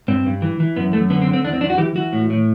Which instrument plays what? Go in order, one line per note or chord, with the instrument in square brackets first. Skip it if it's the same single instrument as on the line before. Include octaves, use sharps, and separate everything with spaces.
[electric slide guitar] G2 C4
G2
E3
E3
F#2 B3
F#2 A3
D3 B3
C4
D3
C4
E2 D4
C4
E2 D4
F#4
E3 G4
E3 F#4
A2
A2